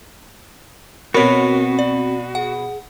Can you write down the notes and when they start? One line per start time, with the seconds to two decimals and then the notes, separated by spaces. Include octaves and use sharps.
1.14 B2 B3 C4 F#4 A#4 C#5
1.79 D5
2.35 G#4 F#5